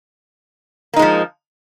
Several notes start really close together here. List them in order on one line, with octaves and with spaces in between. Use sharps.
A#3 D#4 G#3 F3